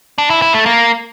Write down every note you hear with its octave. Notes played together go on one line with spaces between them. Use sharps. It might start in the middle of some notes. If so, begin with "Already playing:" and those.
D4
E4
E4
A3
A#3